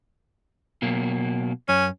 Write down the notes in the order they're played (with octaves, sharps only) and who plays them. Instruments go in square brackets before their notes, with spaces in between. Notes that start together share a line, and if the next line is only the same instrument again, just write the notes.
[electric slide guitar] B2 F#3 A#3
[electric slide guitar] F#2 [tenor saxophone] C#4